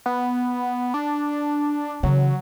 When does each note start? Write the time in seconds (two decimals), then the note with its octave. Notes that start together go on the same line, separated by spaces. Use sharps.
0.06 B3
0.94 D4
2.03 C#3 E3 F#3